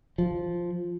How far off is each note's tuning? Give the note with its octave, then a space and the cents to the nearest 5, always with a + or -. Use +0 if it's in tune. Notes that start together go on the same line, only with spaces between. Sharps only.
F3 +0